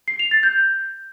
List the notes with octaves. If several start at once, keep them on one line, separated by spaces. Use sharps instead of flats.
C7
F7
A6
G6